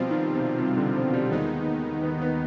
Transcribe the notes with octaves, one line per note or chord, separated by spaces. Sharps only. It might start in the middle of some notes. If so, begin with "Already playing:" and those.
Already playing: B2 F3 G3 C4 F4
D#3
C3
C3
D3
F3
G3
D#2 D#3 G#3 B3 D#4
B3
B3